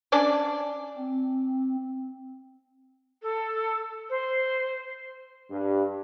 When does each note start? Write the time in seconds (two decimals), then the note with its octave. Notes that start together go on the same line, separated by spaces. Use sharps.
0.12 C#4 D4 D5
0.97 C4
3.22 A4
4.10 C5
5.50 G2